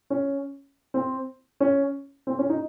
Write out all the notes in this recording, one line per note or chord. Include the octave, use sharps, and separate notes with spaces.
C#4
C4
C#4
C4
C#4
D#4